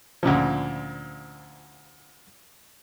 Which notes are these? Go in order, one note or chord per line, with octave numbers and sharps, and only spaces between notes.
D2 A#2 C#3 F3